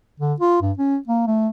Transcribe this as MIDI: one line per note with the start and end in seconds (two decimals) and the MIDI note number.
0.20 0.34 50
0.40 0.59 65
0.62 0.72 43
0.78 0.98 61
1.07 1.26 58
1.27 1.48 57